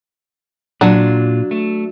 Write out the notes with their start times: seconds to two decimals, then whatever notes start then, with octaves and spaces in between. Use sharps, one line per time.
0.81 A#2 F#3 D4 F4
1.51 A3